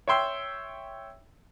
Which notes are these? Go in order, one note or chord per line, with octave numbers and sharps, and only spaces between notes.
C#5 E5 G5 C6 E6